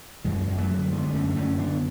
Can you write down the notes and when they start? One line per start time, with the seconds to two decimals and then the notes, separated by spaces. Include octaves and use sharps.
0.24 F#2 E3 G#3
0.40 F#3
0.47 F#2 G#3
0.58 F#3 A3
0.69 D3
0.82 A3
0.91 D3 G#3 B3
1.03 B3
1.13 F#2 A3 C#4
1.29 D4
1.36 F#2 A3 C#4
1.58 D3 B3 D4